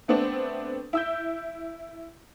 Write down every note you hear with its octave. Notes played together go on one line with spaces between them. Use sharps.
A3 B3 C4 D4
E4 E6 G6